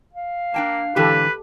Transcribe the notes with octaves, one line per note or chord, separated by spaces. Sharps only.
F5
A#3 D4 G5 A5
G#2 D3 E3 G4 A4 B4